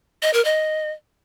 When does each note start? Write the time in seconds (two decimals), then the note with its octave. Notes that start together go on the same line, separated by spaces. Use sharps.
0.22 D#5
0.33 A#4
0.45 D#5